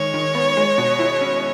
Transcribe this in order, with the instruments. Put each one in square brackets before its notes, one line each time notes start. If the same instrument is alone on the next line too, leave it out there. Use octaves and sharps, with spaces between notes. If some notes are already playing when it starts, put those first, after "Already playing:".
Already playing: [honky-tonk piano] D#3 G#3 [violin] C#5
[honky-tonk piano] D#3
B3
G#3
B2
E4
C#4